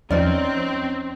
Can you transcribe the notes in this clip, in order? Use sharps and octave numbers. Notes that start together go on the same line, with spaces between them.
E2 F3 C4 C#4 D#4 D5 F6 A6